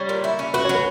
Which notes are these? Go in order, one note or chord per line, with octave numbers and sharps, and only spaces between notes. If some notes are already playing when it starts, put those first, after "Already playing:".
Already playing: G3 C#5
A#2
E4
C#4
F#4 B4
C#5
F#3
B4